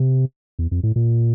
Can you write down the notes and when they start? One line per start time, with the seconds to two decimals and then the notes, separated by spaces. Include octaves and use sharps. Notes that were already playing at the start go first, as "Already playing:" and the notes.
Already playing: C3
0.59 E2
0.71 F2
0.83 A2
0.96 A#2